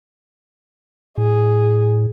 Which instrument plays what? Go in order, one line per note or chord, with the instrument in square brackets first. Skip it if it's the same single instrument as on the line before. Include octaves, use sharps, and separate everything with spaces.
[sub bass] A2 [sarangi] G#4